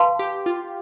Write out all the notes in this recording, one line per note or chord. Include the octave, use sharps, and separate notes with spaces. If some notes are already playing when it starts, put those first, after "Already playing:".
Already playing: B4 F5 A5 C6
G4
F4